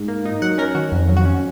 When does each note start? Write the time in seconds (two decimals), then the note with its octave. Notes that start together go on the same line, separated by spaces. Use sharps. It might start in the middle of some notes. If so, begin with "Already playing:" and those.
Already playing: G#2
0.08 A#3
0.25 D#4
0.42 F#3 F#5
0.58 C#4 A#4
0.75 D#3 F#4
0.92 F2
1.09 F#3
1.17 F#4
1.25 C#4